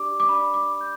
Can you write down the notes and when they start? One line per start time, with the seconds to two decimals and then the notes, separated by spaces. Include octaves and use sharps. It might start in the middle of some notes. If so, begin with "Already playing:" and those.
Already playing: D4 G4 D5 D6
0.20 D6
0.29 D4 G4 D5 B5
0.54 D6
0.81 G6